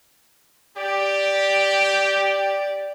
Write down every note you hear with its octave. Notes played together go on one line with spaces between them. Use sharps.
G4 D5